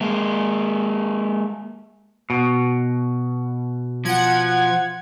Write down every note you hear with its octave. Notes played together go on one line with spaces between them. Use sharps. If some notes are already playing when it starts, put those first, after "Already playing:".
G#3 A#3
B2
F3 F#5 G#6